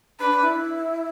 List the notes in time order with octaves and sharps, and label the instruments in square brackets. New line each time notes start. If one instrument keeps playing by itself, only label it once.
[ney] D4 [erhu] B4
[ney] D4
E4